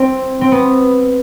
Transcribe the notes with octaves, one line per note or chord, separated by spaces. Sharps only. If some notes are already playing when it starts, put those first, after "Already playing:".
Already playing: C4
C4
B3